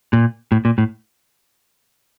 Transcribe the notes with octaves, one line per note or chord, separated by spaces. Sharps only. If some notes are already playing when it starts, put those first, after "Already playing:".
A#2
A2
A#2
A2